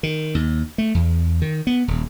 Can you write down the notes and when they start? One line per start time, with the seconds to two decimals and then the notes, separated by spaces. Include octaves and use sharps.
0.03 D#3
0.35 D#2
0.78 A3
0.94 E2
1.42 D#3
1.67 B3
1.88 D#1